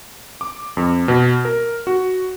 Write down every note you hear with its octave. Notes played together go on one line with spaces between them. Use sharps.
D6
F2
B2
A#4
F#4